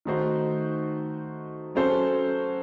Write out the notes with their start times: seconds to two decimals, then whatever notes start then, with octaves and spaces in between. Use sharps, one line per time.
0.05 D#3 A3 D#4 F#4 C5
1.75 F#3 C#4 F#4 A4 C5